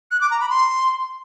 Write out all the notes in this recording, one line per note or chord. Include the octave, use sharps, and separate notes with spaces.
F#6
D6
A#5
B5
C6